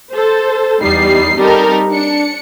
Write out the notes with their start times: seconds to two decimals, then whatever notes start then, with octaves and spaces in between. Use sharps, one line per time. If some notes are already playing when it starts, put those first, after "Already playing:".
0.11 A4 C5
0.83 E2 G3 D#4 C7
1.38 G3 C4 D#4 G4 A4 A#4
1.91 D4 C#7